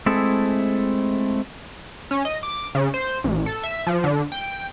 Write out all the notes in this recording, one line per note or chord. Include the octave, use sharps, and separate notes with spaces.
G#3 A3 C4 E4 G#4 A4
C#4
D#5
D6
C#3
C5
A1
A4
E5
F3
D3
G5